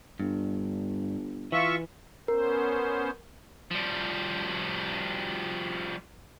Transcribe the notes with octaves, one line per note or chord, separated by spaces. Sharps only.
G1 G2
E3 F4 E5 C#6
B3 C#4 A#4 C5
F3 G3